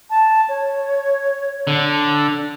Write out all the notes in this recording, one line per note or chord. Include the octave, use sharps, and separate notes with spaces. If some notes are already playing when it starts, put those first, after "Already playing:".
A5
C#5
D3